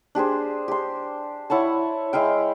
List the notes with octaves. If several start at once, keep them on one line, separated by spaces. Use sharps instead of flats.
D4 G4 G#4 C5
G4 C6
E4 C#5 F#5 A5
G#3 E4 F5 G5